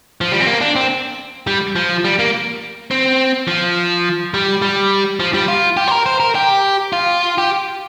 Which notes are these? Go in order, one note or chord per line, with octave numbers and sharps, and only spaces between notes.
F3
G3
C4
A#3
D4
C4
G3
F3
G3
A#3
C4
F3
G3
G3
F3
G3
F4
G4
C5
A#4
C5
A#4
G4
F4
G4